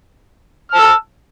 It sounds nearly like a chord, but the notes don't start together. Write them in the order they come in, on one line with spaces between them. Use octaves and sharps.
F6 A5 E6